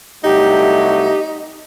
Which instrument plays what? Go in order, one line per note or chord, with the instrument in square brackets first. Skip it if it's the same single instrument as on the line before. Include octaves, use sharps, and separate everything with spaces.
[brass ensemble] C2 F#3 A3 [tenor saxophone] D#4 [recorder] G4